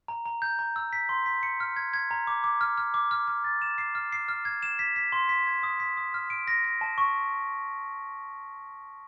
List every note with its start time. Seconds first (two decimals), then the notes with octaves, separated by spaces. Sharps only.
0.08 A#5
0.26 A#5
0.42 G6
0.59 A#5
0.76 E6
0.93 B6
1.09 C6
1.26 B6
1.43 C#7
1.60 F6
1.76 G#6
1.93 G#6
2.11 A#5
2.27 D6
2.44 D6
2.61 F6
2.78 F6
2.94 D6
3.11 F6
3.28 F6
3.44 A6
3.62 E7
3.78 C7
3.95 F6
4.12 C7
4.28 F6
4.45 G#6
4.63 E7
4.79 B6
4.96 B6
5.12 C6
5.29 B6
5.47 G#6
5.63 D#6
5.80 B6
5.97 D#6
6.14 F6
6.30 D7
6.48 A#6
6.64 A#6
6.81 A5
6.98 C#6